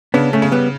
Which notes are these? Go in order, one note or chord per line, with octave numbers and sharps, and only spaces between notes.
C#3 B3 D4
A3 C#4
C#3
G3 B3